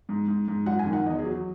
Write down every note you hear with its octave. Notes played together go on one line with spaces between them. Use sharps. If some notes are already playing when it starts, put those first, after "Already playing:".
G#2
G#2
G#2
F#2 F#5
G#5
D#3
F#5
E2 D#5
G#4
F#3